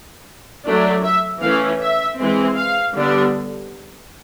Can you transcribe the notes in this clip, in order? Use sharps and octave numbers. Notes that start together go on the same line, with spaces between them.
F#3 A3 D4
E5
E3 A3 C#4 F5
E5
E3 G#3 C4
F5
D3 G3 B3 D4